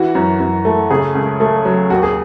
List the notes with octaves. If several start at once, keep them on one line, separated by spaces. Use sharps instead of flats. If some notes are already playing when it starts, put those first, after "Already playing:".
Already playing: E3 F#4
F#2
F#2
A3
C#3 G#4
C#2
A3
F#3
D#2 F#4
G#4